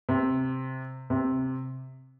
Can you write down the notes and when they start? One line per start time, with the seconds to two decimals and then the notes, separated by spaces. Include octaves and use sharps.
0.09 C3
1.10 C3